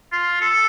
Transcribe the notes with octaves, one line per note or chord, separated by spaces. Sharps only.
F4
A4